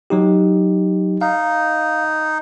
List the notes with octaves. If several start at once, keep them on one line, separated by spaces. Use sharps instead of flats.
F#3 D#4 G4
D#4 F5